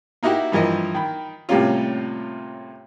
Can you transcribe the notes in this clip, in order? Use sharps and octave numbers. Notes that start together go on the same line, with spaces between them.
A#3 D#4 E4 F#4 G4
G2 E3 F3 A#4 D#5
D#3 B5
A2 C3 G3 A#3 C#4 F4